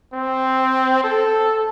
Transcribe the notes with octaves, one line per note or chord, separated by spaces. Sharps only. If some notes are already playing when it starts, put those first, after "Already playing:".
C4
A4